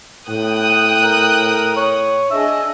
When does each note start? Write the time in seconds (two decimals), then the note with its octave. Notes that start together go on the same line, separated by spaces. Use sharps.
0.28 A2 G5 D#6 F#6
1.04 A#4
1.77 C#5
2.31 D4 G#4 D#5 E5